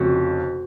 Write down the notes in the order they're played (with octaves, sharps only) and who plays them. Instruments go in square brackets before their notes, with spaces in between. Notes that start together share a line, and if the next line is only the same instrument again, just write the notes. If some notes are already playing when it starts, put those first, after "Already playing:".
Already playing: [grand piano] F1 F2 C#3 [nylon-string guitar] F#4